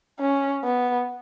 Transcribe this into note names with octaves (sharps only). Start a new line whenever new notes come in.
C#4
B3